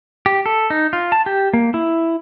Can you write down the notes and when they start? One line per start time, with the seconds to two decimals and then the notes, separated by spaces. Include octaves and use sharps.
0.26 G4
0.46 A4
0.70 D#4
0.93 F4
1.12 A5
1.26 G4
1.54 A#3
1.74 E4